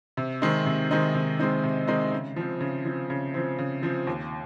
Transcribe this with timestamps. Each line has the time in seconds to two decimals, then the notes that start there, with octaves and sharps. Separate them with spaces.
0.17 C3
0.42 D#3 G#3 C4 D#4
0.66 C3
0.91 D#3 G#3 C4 D#4
1.15 C3
1.39 D#3 G#3 C4 D#4
1.64 C3
1.87 D#3 G#3 C4 D#4
2.12 C#3
2.36 F3 C4
2.61 C#3
2.85 F3 C4
3.10 C#3
3.34 F3 C4
3.59 C#3
3.83 F3 C4
4.07 D#2